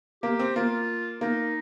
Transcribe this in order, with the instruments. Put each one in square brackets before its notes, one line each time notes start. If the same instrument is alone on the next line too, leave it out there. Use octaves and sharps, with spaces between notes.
[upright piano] A#3 [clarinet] G4
[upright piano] C4
[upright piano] A#3 [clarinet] F4
[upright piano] A#3 [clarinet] D#4